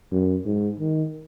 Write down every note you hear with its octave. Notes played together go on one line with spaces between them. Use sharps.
F#2
G#2
D#3